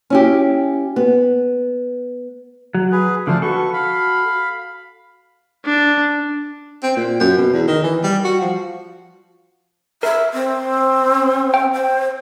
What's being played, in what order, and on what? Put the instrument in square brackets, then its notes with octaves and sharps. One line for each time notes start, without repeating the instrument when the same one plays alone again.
[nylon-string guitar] C#4 E4 G4
B3
[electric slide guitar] F#3
[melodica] G#4 B4
[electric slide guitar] D3 F3 [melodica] A3 D4 F5
[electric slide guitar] F#4 A4 [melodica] B4 C#6
[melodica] F5 B5
[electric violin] D4
[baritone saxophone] C4
A#2
F#2
B2
E2
D#3
E3
G3
F#4
F3
[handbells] A#4 [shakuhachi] E5
[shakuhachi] C4
[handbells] G5
[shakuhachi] C5